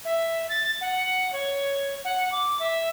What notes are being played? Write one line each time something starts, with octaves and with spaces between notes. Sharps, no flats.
E5
A6
F#5
C#5
F#5
D6
E5